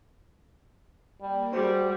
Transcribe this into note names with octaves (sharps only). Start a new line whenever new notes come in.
G3 A#3
G3 F#4 G#4 C5